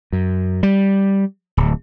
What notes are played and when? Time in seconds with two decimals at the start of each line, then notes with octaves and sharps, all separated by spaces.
0.13 F#2
0.63 G3
1.57 D1